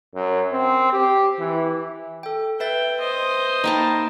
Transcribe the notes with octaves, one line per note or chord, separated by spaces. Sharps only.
F#2
C4
G4
E3
A4 G5
B4 E5 G5 A6
C5 D#5
A#3 D#4 A#4 G5 A5 B5